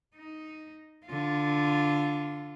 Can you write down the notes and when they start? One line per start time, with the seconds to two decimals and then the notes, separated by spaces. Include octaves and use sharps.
0.16 D#4
1.06 D3 F4